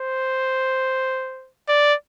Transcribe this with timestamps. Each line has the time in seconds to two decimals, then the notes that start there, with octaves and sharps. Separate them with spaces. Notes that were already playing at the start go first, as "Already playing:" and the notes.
Already playing: C5
1.68 D5